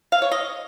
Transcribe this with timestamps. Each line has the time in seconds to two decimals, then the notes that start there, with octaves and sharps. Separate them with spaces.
0.12 F5
0.22 C#5
0.32 D#5